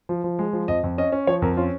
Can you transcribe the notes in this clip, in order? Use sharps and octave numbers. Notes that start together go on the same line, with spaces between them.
F3
F3
G#3
F3
F2 D#5
F2
C#4 D#5
C#4
F3 C#5
F2 A#4
C#4 F4